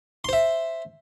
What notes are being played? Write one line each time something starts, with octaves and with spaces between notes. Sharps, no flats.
C5 E5 C6